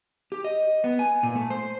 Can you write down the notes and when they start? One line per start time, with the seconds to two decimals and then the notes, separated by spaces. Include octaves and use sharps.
0.32 G4
0.44 D#5
0.84 B3
0.99 G#5
1.23 A#2
1.35 A3
1.50 C5